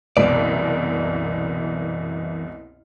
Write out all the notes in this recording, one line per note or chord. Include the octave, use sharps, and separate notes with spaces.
F#1 C2 B2 E3 D5